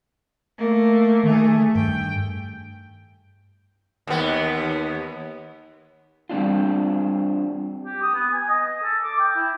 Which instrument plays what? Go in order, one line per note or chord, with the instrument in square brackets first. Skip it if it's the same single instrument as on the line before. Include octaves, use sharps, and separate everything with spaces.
[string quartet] A3 A#3
[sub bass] D#3 [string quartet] A3 G#4
[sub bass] G2 [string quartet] G5
[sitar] D#2 B3
[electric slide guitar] G3 C4 D4 F4
[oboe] G4
D#6
B3
G#5
D#5
A4
D6
G5
E4